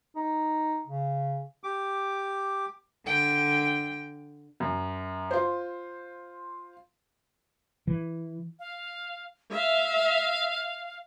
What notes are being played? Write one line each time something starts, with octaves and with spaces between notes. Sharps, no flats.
D#4
C#3
G4 D6
D3 G5
F#2
F4 C5
E3
F5
E5 F5